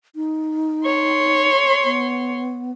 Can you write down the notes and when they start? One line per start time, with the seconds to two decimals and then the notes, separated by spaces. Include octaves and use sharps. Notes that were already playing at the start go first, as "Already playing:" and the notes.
0.16 D#4
0.85 C#5 C6
1.84 B3